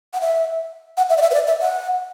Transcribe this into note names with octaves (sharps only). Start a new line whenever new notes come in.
F#5
E5
F#5
E5
D5
E5
B4
D5
E5
F#5